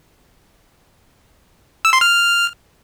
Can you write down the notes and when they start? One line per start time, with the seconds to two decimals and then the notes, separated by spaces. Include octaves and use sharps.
1.85 E6
1.93 C6
2.01 F6